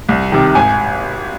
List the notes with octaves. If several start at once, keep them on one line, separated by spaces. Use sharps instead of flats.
C2
C3 D#3
G#1 G#5